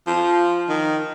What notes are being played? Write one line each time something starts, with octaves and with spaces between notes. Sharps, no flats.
F3
D#3